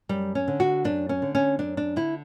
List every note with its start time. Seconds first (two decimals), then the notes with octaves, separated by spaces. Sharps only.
0.09 F#2 G3
0.35 C#4
0.48 D3
0.60 F#4
0.84 F#2 D4
1.09 C#4
1.22 D3
1.35 C#4
1.59 F#2 D4
1.77 D4
1.96 D3 E4